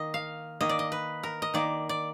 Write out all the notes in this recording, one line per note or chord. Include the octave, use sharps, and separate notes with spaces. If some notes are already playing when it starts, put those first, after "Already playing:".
Already playing: D#3 A#3 D#5
F5
D#3 A#3 D#5
D5
D#5
B4
A#4
D#5
D#3 A#3 D5
D5